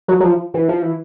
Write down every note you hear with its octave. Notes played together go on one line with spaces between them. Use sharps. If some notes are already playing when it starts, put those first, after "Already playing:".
F#3
F#3
F3
E3
F3
E3